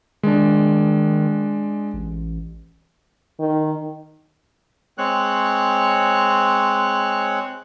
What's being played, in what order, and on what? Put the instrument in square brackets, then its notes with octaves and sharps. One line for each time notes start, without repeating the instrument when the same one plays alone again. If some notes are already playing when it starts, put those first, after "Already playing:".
[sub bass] D#3 [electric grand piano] G#3 D4
[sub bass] A1
[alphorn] D#3
[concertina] G#3 C4 C#5 F#6